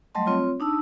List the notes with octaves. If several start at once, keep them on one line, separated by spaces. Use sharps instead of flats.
F#3 G3 A3 D#5 A5 C6
C4 F4 C#5
D4 D#4 A5 E6